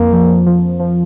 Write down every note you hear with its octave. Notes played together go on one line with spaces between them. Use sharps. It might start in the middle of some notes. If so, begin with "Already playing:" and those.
Already playing: F2 A#3
F3
F3
F3